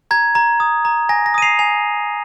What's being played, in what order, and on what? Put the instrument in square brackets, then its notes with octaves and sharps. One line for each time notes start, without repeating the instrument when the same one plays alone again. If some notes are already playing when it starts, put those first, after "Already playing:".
[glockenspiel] A#5 G#6
A#5
D#6
A#5
G#5 A#6
A#6
D#6 D#7
C7 F7
G#5 C7 F7